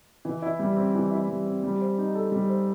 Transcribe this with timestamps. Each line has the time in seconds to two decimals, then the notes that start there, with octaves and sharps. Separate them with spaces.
0.25 E3
0.42 E4
0.59 G3
0.76 C4
0.95 E3
1.11 E4
1.28 G3
1.46 C4
1.64 G3
1.81 C5
1.98 D#4
2.15 A4
2.32 G3
2.49 C5